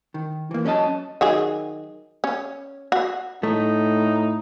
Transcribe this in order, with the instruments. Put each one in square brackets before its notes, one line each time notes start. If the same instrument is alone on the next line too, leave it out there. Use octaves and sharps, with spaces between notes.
[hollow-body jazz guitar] D#3
E3 A#3
F#3 C#4 G4 D#5 A5
[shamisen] D#3 F#3 G#4
C#4
F#4
[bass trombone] A2 [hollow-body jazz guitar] A3 [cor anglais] D#4